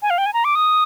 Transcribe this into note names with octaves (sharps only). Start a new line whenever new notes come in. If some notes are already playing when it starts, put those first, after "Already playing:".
G#5
F5
G5
G#5
A#5
D6
D#6